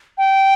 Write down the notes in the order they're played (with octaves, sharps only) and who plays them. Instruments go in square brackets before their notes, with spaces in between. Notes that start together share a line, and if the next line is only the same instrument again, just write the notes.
[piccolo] G5